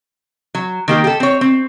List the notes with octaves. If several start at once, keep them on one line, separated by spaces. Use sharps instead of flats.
F#3
D#3 A#3 G4
G4 A4
C4 C#5
C4